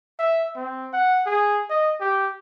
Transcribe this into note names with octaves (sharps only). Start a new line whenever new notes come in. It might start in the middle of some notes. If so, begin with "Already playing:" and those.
E5
C4
F#5
G#4
D#5
G4